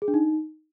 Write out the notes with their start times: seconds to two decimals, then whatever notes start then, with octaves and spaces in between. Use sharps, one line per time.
0.02 G#4
0.08 D4
0.14 D#4